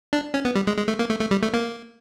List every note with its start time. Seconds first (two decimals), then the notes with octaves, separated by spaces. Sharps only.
0.13 D4
0.34 C#4
0.45 B3
0.55 G3
0.67 G#3
0.77 G#3
0.88 A3
0.99 A#3
1.10 A3
1.21 A3
1.31 G3
1.43 A3
1.54 A#3